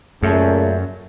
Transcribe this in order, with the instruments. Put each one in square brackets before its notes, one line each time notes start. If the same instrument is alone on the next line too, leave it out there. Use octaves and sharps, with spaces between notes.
[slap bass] F#2 [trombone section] A#2 C#3 A3